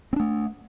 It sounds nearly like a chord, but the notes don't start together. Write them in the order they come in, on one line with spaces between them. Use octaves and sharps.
C4 D4 A3